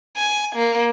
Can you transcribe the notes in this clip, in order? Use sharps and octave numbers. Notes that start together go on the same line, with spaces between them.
G#5
A#3